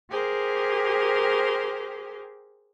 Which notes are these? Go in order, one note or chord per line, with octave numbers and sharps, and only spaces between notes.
G4 G#4 A#4 C5